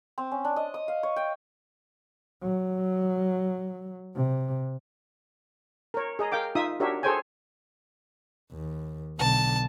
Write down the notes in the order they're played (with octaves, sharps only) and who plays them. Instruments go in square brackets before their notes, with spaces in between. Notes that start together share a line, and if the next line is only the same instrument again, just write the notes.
[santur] C4
C#4
D4
D#5
D#6
F5
C#5
G5
[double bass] F#3
C3
[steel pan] A#4 C#5
G#4 D#5 A#5
A#4 F5 G5 D6
D#4 F4 E5 D#6
D4 F#4 G4 A#4 C#5 E5
G#4 A4 C5 C#5 G5 G#5
[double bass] D#2
[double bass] B1 D3 [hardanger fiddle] A5